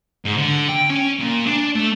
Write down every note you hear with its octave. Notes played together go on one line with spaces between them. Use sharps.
G#2
D3
G5
C#4
A#2
D4
A3